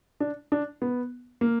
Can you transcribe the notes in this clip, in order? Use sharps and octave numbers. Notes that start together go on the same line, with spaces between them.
D4
D4
B3
A#3